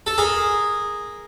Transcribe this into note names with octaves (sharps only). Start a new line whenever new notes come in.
A4
G#4 A#4